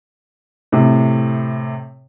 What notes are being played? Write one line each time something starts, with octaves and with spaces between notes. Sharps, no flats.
A2 C3